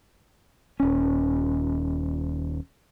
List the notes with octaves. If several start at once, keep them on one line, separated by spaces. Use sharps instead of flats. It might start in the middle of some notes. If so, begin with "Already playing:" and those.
D#1 C#4